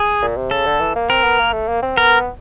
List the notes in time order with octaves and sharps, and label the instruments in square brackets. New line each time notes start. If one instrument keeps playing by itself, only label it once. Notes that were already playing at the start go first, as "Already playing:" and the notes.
Already playing: [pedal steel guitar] G#4
[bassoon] A#2
C3
[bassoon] C#3 [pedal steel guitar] A4
[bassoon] D3
E3
A#3
[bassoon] C4 [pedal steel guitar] A#4
[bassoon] B3
A#3
A3
A#3
C4
[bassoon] B3 [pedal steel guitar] A#4